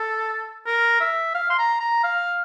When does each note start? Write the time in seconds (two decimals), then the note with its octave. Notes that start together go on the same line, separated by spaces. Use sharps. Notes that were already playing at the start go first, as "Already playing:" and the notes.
Already playing: A4
0.66 A#4
1.00 E5
1.35 F5
1.50 C6
1.58 A#5
1.80 A#5
2.03 F5